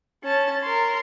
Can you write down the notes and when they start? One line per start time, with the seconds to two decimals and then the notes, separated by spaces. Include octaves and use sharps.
0.24 C#4 A5
0.63 A#4 C6